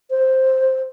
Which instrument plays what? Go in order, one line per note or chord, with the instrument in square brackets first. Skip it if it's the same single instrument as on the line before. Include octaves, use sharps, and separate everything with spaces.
[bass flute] C5